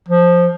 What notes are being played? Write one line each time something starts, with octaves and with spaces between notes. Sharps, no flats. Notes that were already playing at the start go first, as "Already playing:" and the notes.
F3